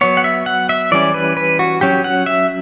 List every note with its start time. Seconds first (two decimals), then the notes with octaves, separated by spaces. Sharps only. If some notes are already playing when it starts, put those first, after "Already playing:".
0.01 F#3 B3 C#5
0.17 F#5
0.24 E5
0.46 F#5
0.69 E5
0.91 E3 G3 C#4 D5
1.14 B4
1.37 B4
1.59 F#4
1.81 F#3 C#4 G4
2.04 F#5
2.26 E5